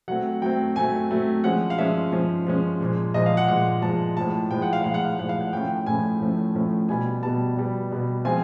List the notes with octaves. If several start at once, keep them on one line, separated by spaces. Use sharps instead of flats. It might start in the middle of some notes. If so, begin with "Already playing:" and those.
F#3 A3 C4 F#5
F#3 A3 C4 G5
F#3 A3 C4 G#5
F#3 A3 C4
F3 G#3 C#4 F#5
F5
F3 G#3 C#4 E5
F3 G#3 C#4
F3 G#3 C#4
A#2 F3 G#3
A#2 F3 G#3 D#5
F5
F#5
A#2 F3 G#3 F#5
A#2 F3 G#3 A5
A2 F3 G#3 A5
A2 F3 G#3 G5
F#5
F5
A2 F3 G#3 F5
F#5
F5
A2 F3 G#3 F#5
F5
F#5
A2 F3 A3 C#4 G5
A2 F3 A3 C#4 G#5
A2 F3 A3 C#4
A2 F3 A3 C#4
B2 G3 B3 G#5
B2 G3 B3 A5
B2 G3 B3
B2 G3 B3
F3 G#3 C4 F4 G#5